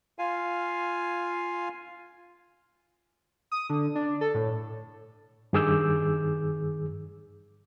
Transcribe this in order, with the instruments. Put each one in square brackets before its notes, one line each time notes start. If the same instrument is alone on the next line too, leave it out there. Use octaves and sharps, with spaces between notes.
[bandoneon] F4 F5 G#5
[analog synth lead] D#6
D3
D4
A4
A2
[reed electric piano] G2 D#3 G#4 D6 E6 G6